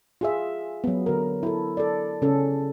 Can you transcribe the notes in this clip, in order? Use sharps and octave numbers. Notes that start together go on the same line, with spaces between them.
F4 G#4 E5
F#3 B3
D3 A#4
E4 A4
A4 D5
C#3 C#4 A4